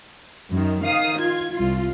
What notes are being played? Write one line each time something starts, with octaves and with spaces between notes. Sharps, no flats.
F#2 D#3
D#3 F5 D#6
F4 G#6
C2 F4